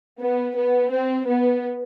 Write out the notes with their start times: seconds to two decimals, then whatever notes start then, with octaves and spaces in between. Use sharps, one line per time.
0.21 B3
0.56 B3
0.91 C4
1.27 B3